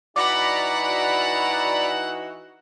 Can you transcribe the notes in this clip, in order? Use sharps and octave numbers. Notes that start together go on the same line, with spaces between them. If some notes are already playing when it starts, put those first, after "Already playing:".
E3 D#4 F#4 D5 F#5 A#5 B5 D6